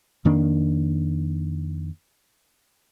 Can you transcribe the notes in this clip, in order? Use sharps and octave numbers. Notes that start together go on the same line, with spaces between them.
F2 D#3 A#3 D4